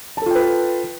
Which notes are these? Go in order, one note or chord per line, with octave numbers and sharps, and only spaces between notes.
F4 A4 B4 G5 A5